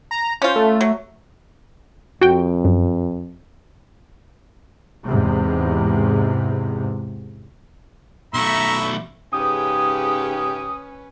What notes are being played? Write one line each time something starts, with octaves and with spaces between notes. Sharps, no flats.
A#5
C#4 F4 C5
A3
F#3
F2 F#4 G5
F#2
E2 G#2 C3
B1 A3 E5 A#5 B5 C#6
G#2 C#3 C#4 G4 B4 D#6